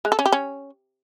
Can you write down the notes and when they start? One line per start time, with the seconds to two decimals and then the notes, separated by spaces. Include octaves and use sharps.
0.05 G#3
0.12 A4
0.19 C#4
0.26 G4
0.32 C#4